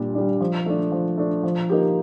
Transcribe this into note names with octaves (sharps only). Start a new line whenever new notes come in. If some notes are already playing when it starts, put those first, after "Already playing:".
Already playing: A#2 G3 D4
G3 D4
F3
A3 D4
F3
A3 D4
F3
A#3 D#4 G4